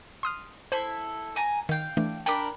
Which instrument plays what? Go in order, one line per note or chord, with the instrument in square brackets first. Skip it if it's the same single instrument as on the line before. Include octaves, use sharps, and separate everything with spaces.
[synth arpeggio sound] C6 D#6 F6
[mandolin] E4 A4 [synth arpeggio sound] C5
[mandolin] G#5 A#5
[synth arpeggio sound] D#3 [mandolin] F5 G5
[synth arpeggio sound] E3 A3 D4
[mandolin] D4 A#4 B5 [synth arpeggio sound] G5 D6